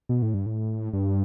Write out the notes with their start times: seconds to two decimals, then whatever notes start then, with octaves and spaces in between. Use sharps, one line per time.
0.09 B2
0.22 A2
0.34 G2
0.46 A2
0.93 G2